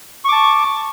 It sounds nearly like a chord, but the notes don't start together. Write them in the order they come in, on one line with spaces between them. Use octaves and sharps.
C#6 D6 A5